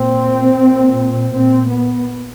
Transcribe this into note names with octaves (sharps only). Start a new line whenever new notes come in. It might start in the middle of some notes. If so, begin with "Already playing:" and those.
Already playing: A#2 C4
A#2
A#2 C4
B3